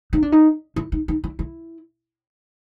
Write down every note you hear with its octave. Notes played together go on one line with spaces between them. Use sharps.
D#4
D4
D#4
E4
D#4
D#4
E4
E4